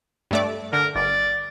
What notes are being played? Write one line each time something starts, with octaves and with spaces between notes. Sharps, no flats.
G2 A3 D5
D3 A#4
G1 D5